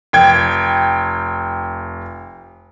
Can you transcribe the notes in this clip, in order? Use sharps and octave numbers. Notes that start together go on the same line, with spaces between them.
F1 G5 G#6